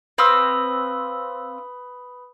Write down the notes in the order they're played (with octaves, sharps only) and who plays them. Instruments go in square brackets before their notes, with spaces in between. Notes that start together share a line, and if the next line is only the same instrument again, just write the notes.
[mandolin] C4 F5 E6 [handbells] B4 B5 D#6